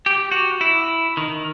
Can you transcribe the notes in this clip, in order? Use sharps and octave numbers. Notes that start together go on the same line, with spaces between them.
G4
F#4
E4
D#3